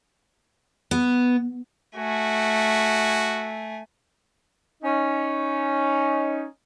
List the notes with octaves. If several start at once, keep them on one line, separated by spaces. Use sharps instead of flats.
B3
A3 F#4 G#5
C#4 D#4